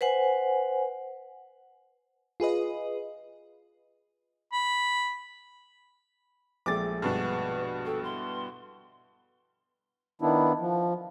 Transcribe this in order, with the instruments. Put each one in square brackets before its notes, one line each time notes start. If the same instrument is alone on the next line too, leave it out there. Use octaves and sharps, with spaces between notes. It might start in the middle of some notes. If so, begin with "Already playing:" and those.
[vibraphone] B4 C5 F#5 G#5
[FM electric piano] F4 G#4 B4 D#5
[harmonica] B5
[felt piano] A#1 G#3 A3 [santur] G4 G5 [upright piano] D6 A6
[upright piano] G2 B2 D4 [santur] F#4 [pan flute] B4
[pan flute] A4 [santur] D#5 G5 D#6
[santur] B3 E4 [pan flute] C6
[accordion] D#3 B3 D4 E4
F3